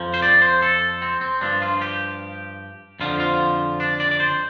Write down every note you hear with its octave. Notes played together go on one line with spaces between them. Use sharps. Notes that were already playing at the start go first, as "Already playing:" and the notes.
Already playing: F2 F3
C5
D5
C5
A4
C4
C4
G2 F3 D4
F4
G4
F2 D3 F3 F4
F4
D4
D5
D5
C5